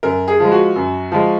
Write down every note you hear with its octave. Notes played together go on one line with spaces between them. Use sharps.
F#2 A#4
G#4
F3 G#3
F#4
F#2
F3 G#3